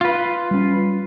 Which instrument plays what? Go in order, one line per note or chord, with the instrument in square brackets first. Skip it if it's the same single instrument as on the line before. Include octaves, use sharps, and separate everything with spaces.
[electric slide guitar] F4 B4
[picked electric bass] G3 C#4